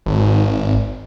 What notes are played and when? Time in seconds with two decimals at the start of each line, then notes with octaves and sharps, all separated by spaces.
0.06 G#1